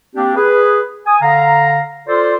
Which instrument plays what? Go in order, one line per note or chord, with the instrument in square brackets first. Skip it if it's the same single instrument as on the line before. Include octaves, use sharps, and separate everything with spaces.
[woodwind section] A#3 C4 D4 G4
G#4 B4
G#5 D#6
D3 F5 A#5
F4 A4 C5 D5